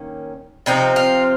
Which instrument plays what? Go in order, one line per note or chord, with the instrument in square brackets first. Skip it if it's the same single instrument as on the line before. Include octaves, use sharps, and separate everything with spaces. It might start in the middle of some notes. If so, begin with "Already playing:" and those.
Already playing: [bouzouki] D#3 A#3 C#4
C3 F3 C4 D#4
F4